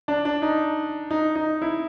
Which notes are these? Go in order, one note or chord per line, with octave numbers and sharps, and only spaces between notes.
D4
D4
D#4
D#4
D#4
E4